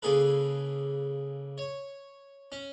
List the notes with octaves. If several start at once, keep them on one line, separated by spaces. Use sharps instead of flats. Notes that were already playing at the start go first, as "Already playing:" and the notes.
C#3 A#3 G#4 A4 B4
C#5
C#4